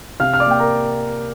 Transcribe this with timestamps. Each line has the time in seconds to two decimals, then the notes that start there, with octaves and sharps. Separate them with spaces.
0.20 C3 F5 F6
0.34 F6
0.40 D5 D6
0.46 A#3 G5
0.60 A#4 A#5